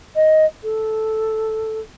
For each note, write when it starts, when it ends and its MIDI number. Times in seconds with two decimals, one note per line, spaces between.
0.16 0.45 75
0.63 1.80 69